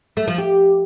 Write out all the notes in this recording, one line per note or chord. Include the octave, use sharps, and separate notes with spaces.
A3
F3
G4